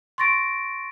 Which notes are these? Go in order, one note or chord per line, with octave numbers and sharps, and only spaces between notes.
C6 C#6 A6 A#6 D7